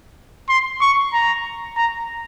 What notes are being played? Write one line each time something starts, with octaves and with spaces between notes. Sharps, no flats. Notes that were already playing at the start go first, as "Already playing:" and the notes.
C6
C#6
A#5
A#5